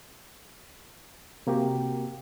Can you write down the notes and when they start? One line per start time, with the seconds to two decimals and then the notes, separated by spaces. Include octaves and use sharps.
1.47 C3 A#3 F#4 G4